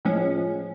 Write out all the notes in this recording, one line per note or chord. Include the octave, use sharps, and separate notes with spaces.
A2 F3 G#3 C#4